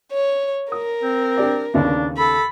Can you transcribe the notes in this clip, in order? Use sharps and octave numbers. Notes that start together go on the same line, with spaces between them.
C#5
A#4 D#6
C4
D4 G4 D5
D#2 C#3 B3 D4
A4 B5